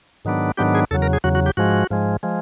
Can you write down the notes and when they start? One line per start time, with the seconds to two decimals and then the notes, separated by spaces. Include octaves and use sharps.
0.25 G#2 D#3 F#3 B3 D4
0.57 G#2 D#3 F#3 B3 D4 G4
0.75 G#4
0.91 E2 C#3 F#3 A4
1.02 A#4
1.13 G#4
1.24 E2 C#3 F#3 F#4
1.35 F#4
1.46 G4
1.57 G#2 F3 G#3 F#4
1.90 G#2 F3 G#3
2.23 F3 G#3